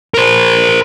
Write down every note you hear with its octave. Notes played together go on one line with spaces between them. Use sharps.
A#4 C5